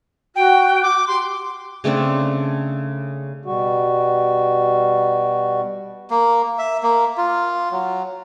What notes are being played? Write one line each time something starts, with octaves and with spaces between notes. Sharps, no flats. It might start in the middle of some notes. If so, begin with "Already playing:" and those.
F#4 G5
D6
G4 C6
C#3 A3 C4 D4
B2 G3 F#4
A#3
E5
A#3
F4
F#3